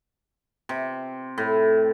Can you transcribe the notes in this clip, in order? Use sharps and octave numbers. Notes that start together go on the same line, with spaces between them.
C3
A2